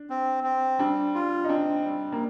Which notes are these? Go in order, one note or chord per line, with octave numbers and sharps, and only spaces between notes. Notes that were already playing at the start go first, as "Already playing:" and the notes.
Already playing: D4
C4
C4
G3 D4
F4
D#4
C4 D4
G3
A#3